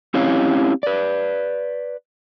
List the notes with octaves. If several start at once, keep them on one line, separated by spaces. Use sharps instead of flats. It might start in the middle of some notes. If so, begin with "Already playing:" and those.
C4 C#4 E4 G4 C#5 F5
B4 D5